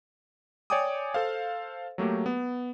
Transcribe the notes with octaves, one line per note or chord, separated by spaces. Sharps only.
C#5 D5 G5 G#5 D6 D#6
A4 C5 F5
F#3 A3 A#3 G4
B3